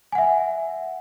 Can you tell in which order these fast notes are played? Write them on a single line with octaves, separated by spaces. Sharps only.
G#5 F#5 E5